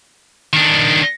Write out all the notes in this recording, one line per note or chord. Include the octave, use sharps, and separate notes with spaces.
D#3 D4